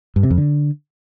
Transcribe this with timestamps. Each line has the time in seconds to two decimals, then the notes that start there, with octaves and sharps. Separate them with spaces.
0.16 G2
0.23 C3
0.31 F2
0.38 D3